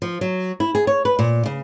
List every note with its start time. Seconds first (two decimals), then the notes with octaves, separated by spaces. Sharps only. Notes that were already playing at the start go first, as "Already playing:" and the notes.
0.02 F3
0.21 F#3
0.60 E4
0.75 G#4
0.87 C#5
1.05 B4
1.19 A#2
1.46 C#3